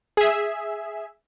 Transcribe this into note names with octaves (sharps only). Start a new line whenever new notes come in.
G#4 E5